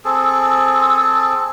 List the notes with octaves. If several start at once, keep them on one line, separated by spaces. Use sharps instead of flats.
C4 G#4 A4